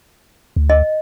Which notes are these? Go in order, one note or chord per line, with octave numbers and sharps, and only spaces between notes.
D2
D#5